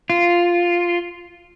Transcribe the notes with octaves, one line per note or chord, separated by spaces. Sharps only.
F4